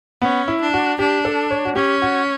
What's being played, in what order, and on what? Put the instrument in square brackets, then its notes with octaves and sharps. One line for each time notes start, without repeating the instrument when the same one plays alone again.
[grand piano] B3 [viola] C#4
[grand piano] E4
[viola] D4
[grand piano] F#4
[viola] D4 [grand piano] G4
[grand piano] A4
C#5
F#4
[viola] C#4 [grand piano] G4
[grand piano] F#4